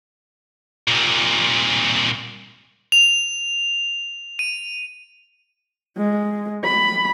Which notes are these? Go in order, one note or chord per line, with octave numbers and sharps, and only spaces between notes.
C2 A#2
F7
D#7
G#3
B5